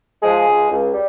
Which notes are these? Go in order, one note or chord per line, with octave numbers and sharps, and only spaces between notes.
F3 G#3 G#4
C#2
C#2
G3